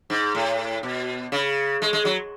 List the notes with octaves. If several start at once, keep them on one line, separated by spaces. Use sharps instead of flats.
G#2
A2
B2
C#3
G#3
G#3
F#3